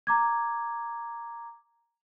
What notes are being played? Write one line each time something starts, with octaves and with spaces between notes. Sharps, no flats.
A#5 D6 G#6